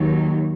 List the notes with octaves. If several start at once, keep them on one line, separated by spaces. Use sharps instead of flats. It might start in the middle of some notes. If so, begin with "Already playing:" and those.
Already playing: D#2 D#3 F#3